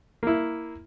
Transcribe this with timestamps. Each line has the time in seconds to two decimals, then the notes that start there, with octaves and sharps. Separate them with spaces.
0.23 A#3 E4